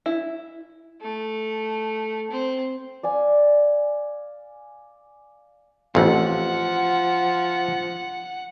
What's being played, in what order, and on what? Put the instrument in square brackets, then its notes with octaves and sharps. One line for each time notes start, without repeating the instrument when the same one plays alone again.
[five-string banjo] E4
[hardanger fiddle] A3
C4
[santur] D5 F5 G#5
[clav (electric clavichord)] A1 F2 [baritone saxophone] F3 [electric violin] F#5